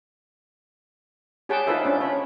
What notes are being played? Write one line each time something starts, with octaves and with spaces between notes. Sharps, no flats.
G4 G#4 C#5 F#5 G5 A5
D#4 F4 A4 B4 C5 E5
C#4 D4
C#5 B5